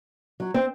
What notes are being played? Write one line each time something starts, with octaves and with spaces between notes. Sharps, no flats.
F#3
C4